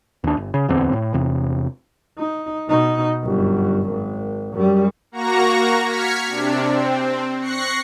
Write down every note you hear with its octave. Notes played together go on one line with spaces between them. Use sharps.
D#2 D4
G1
C#3
D1 E2 D3 C4
A2
E2 C3
D#4
B2 D#4
G1 F#2
G#1
F#2 G3
A#3 F#4 A#5 C#6 A#6
F6 G#6 B6 C#7
C3 D4
C4
C#6 F#6 A#6 C7 C#7